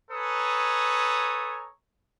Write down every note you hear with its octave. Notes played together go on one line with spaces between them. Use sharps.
A4 B4 C#5 G#5 A#5 D#6